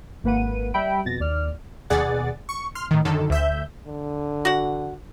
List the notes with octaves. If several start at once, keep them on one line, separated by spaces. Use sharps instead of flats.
G#1 A#3 B4 F#5 D#7
G3 E5 G5 B5 D7
F2 B2 A6 A#6
D#2 D5 F6
D#2 B2 G#4 D5 F#5 A6
C#6
C6 F6
A2 D#3
F#2 D3 D#3 A4
D2 E5 G6
D3
F#4 F#5